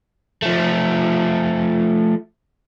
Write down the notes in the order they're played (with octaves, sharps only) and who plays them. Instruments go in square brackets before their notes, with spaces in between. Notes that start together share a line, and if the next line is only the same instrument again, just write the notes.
[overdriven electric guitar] F3 A3